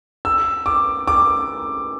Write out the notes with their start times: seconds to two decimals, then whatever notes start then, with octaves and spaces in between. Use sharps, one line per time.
0.25 E6
0.66 D6
1.08 D6